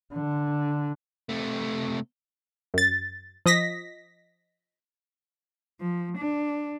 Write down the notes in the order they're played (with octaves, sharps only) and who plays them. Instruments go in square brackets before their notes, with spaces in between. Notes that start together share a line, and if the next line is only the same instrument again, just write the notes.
[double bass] D3
[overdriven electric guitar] C3 A3
[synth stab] F#2 A6
F3 D#5 A#6 B6
[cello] F3
D4